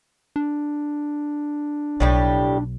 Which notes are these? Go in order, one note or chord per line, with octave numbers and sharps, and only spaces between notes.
D4
B1 A2 G3 G4